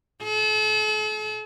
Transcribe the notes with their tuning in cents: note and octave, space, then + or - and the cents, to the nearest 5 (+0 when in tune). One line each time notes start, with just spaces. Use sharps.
A4 -45